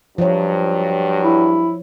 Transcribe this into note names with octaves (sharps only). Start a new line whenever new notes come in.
G2 F3 F#3 C#5
E4